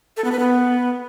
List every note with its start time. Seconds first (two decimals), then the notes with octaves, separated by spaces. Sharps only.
0.17 A4
0.24 B3
0.32 B4
0.39 B3